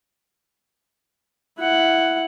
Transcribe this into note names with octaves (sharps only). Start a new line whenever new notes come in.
E4 F#5